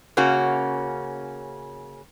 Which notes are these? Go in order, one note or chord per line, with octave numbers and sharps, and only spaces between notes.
C#3 A#3 C#4 F#4